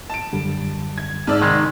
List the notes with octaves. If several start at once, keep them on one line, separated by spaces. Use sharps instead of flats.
A5 D7
F#2 D3 G3
G#6
G#2 D5 A5 E6 F6
C2 D#3 G#3 D#5